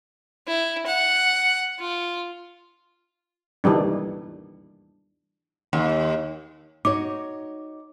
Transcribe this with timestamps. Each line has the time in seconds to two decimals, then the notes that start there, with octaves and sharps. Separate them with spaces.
0.47 E4
0.86 F#5
1.79 F4
3.64 D#3 E3 G3 D4
5.73 D#2
6.85 D#4 F#4 C#5 D6